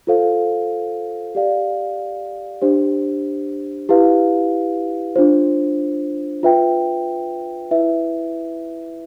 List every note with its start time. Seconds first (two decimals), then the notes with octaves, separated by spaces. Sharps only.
0.07 F4 A4 C5 F5
1.35 G4 D5 F5
2.61 D4 G4 C5
3.89 E4 G4 B4 F5
5.16 D4 F4 C5
6.43 F4 B4 E5 G5
7.71 E4 B4 E5